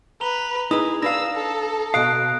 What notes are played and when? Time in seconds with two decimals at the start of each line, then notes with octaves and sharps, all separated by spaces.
0.21 B4 A#5 F7 G7
0.71 D#4 E4 G#4 B4 D#6
1.02 D4 B4 F5 E6 A#6
1.35 A4
1.94 B2 F5 D#6 F#6 D7